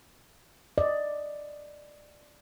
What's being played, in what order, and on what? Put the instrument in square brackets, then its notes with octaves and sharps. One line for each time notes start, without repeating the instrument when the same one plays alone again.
[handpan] D5 D#5